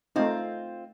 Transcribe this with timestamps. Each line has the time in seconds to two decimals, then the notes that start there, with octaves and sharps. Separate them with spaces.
0.16 A3 C4 D#4 F4